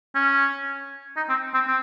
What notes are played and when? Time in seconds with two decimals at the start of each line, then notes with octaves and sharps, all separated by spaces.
0.15 C#4
1.16 D#4
1.29 C4
1.54 C4
1.68 C4